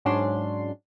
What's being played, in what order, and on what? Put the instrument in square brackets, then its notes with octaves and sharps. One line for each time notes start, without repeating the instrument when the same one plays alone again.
[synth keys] G#2 F#3 C#4 D4 C6